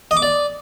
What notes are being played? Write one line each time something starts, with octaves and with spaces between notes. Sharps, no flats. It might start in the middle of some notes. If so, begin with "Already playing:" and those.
D#5
D6
D5